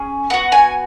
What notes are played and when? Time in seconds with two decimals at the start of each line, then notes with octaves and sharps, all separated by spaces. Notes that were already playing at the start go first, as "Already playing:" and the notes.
Already playing: C#4 G#4
0.30 B3 F#4 F#5
0.52 G#5